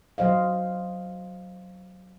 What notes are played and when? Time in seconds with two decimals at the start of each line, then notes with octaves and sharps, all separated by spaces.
0.18 F#3 C5 D#5 F5